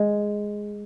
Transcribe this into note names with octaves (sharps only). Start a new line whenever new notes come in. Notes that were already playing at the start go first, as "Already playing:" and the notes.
Already playing: G#3